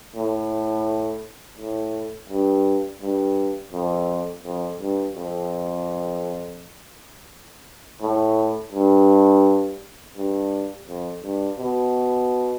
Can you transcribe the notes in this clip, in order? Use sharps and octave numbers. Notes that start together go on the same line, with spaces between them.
A2
A2
G2
G2
F2
F2
G2
F2
A2
G2
G2
F2
G2
B2